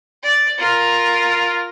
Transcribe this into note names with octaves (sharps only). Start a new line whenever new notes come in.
D5
F4 A#4